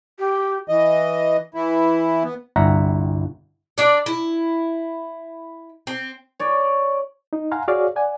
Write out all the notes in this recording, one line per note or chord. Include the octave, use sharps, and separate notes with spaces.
G4
E3 D#5
E3 E4
B3
G1 C2 E5 F#5 A#5
D4 D5
E4
C4
C#5 D5
D#4
F5 F#5 G#5 A#5 C6
F#4 G#4 C#5 D5 F5
D5 F#5 G#5